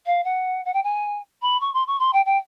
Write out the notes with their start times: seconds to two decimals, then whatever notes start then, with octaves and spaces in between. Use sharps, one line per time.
0.05 F5
0.24 F#5
0.65 F#5
0.73 G5
0.83 G#5
1.41 B5
1.60 C#6
1.73 C6
1.87 C#6
1.99 C6
2.13 G5
2.25 G5